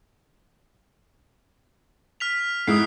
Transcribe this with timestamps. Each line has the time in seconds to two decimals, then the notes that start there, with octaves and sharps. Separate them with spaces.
2.20 F6 B6 F7
2.67 G#2 E4 D#6 C7